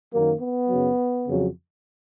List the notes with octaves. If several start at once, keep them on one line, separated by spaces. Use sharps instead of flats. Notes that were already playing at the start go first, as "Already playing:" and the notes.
F#2 D#3 F#3 A#3
B3
F#2 C#3 F#3
F2 C#3 F#3